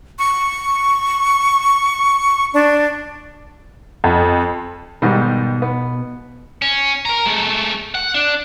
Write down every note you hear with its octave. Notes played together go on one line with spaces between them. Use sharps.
C#6
D4
F2
G#2 B2 D#3 G3
B3
C#4
A#4 A#5
G#3 A3
F#5
D4